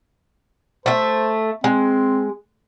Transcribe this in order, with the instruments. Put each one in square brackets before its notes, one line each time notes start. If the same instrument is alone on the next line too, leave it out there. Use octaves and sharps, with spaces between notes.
[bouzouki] A3 E5 [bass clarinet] C5
[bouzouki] G#3 [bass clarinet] C4